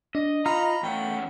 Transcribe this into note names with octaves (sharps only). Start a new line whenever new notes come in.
D4 D#5
D#4 F4 F5 A#5 B5 F6
E2 A3 C#4 F#5 G5